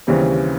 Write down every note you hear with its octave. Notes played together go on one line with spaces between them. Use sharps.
D#2 C#3 E3 G3 C4